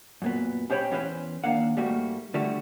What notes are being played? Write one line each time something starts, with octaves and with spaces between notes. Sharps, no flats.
F#2 A#2 B3
C#4 G4 C5 C#5 G5 B5
E2 E3 C#4 B4 C5
D#2 D#3 A#3 D4 F5 F#5
G#2 G3 A3 A#3 F#4
D3 G3 A3 F#4